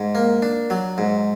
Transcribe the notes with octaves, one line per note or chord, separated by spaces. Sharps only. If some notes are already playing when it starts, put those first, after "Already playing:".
Already playing: G#2
A#3
D4
F#3
G#2